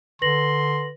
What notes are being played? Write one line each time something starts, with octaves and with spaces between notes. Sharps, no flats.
D3 B4 C6 A#6 F#7